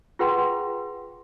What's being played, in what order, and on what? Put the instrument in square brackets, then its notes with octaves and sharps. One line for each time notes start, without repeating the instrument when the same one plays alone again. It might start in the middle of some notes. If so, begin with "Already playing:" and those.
[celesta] F4 G#4 B4 F#5 G5 C6